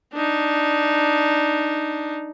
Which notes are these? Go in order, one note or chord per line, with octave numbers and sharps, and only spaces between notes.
D4 D#4